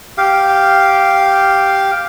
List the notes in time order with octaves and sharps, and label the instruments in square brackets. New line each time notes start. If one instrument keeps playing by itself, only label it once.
[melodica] G4 F5